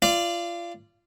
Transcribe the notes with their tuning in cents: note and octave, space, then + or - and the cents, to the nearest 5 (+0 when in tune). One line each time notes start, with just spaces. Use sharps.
F4 -25 D5 +0